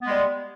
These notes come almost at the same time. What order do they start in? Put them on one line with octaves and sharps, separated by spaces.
B3 G#3 G3